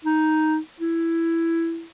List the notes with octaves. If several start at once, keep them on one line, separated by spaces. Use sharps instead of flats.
D#4
E4